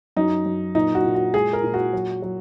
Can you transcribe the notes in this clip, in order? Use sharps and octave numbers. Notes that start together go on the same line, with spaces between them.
F#2 D#4
F#2
A#2 D#4
F#4
A#2
F#4
G#3 G#4
A#4
A#2
F#4
F#3
F#3